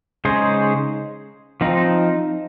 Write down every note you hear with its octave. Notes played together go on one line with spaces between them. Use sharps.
C#3 G#3 D#4 G#4 C5
F3 C4 D#4